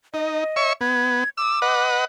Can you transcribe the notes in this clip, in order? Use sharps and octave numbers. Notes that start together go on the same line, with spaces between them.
D#4 D#5
C#5 E5 C#6
B3 G#6
D6 E6
B4 D#5 F#5